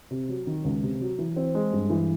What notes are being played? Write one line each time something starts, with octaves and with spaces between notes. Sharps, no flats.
C3
F#3
D#3
C#2
C3
F#3
E3
C4
G#3
G2
E3